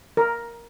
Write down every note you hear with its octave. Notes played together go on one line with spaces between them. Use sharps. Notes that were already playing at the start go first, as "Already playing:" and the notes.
A#4